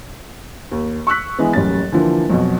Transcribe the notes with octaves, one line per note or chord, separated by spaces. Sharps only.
D#2
C#6 E6 F#6 B6
E3 G#3 B3
D#1 A1 F#2 C#4 A6
D3 E3 F3 A#3
B1 F2 B2